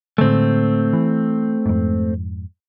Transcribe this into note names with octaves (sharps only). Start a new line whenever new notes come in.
A2 D3 G#3 A3 C4
E3
F2 G#2